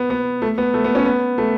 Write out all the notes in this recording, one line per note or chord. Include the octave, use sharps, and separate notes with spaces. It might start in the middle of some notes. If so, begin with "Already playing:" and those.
Already playing: B3
B3
A3
B3
A3
B3
C#4
B3
A3